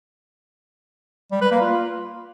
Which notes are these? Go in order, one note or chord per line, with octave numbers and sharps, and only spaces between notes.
G3
B4
A#3
F4